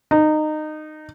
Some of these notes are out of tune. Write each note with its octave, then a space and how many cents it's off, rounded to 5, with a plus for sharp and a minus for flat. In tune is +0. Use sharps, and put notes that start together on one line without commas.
D#4 -20